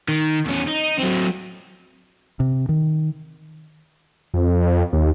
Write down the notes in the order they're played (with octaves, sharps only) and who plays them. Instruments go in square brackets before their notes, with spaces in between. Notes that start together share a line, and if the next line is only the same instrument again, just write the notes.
[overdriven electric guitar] D#3
E2 C#4
D#4
F#3 C4
[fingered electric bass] C3
D#3
[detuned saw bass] F2
D#2